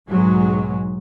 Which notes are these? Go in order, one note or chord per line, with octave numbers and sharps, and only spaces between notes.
B1 G#2 F#3 G#3